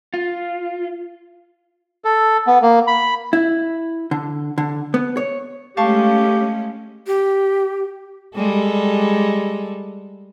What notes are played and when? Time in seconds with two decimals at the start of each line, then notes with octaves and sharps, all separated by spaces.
0.14 F4
2.05 A4
2.47 B3
2.62 A#3
2.87 B5
3.33 E4
4.11 D3
4.58 D3
4.94 B3
5.17 C#5
5.77 G#3 A3 C#4 G4 F5 A5 C#6
7.07 G4
8.36 G3 G#3 A4